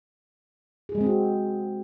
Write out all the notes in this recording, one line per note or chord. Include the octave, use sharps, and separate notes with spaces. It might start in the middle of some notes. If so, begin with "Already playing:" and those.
G#4
G#3
C4
F#4